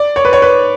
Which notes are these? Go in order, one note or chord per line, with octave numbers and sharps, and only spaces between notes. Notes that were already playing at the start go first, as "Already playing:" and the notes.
Already playing: D5
C#5
B4
C#5
B4